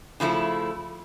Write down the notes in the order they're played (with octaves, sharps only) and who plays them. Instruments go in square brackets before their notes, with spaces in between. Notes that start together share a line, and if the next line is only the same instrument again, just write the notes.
[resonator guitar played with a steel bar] C#3 F3 A3 E4